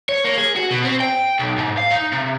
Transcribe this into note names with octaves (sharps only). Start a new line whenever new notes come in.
C#5
A#3
G#4
F#4
B2
C4
G5
B1
G#2
F5
D#4
C3